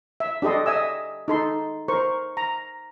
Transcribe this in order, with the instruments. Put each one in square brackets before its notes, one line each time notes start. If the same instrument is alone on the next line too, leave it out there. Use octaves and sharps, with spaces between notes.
[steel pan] E5
D4 G4 A4 D#5 C6
D#5 E5 G#5 E6
D#4 A4 C6
A#4 C5 C#6
A#5